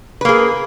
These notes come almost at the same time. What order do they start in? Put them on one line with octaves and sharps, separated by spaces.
B4 A#3 G#4